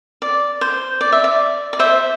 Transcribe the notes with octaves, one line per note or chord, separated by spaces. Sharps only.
D5
C5
D5
E5
D5
D5
C5 E5